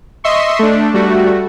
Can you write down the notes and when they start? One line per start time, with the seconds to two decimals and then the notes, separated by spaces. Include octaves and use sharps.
0.24 D#5 E5 C6 C#6
0.59 A3 D4
0.94 G3 A3 F#4